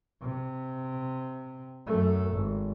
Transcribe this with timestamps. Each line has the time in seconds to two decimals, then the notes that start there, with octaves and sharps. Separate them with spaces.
0.22 C3
1.87 F#2 A3
2.32 G#1